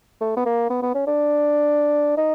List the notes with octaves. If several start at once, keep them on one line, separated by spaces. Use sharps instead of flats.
A3
B3
A#3
B3
B3
C#4
D4
D#4